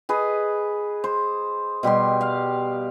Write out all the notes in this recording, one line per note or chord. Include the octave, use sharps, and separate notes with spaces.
G#4 B4 D#5
C5
B2 G3 G4 C6
F5